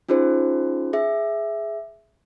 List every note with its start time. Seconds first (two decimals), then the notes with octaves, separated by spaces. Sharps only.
0.09 C#4 D#4 F4 G#4 C5
0.93 G#4 E5